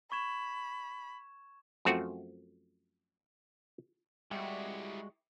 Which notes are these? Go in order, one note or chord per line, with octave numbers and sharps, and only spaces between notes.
B5 C#6 G#6 E7
F#2 F3 A3 C4 F#4
G3 G#3 E4 F#4 G4